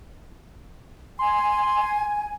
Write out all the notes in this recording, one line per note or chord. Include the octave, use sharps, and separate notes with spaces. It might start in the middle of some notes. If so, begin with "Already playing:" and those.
G#5 C6